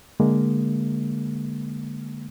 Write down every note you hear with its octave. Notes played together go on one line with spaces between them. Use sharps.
D3 G#3 A#3